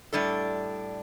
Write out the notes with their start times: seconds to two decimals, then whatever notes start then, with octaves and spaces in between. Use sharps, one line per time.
0.13 A2 G3 D4 A4